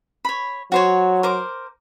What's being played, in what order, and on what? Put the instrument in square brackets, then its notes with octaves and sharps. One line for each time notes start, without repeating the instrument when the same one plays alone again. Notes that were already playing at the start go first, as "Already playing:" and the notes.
[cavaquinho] C#5 B5
[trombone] F#3 [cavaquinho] F#4 C5 C#5
[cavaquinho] A#4 C5 D6